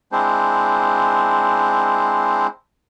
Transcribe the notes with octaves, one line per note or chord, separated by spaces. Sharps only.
G#3 C4 D4 E4 C5